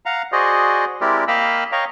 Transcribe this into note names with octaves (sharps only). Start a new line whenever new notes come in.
F5 F#5 A#5
F#4 G#4 C5 D5 D#5
G#3 C4 E4 G4 A#4 D5
A#3 D#5 F5 G5 B5 E6
C#5 D#5 F5 G5 A#5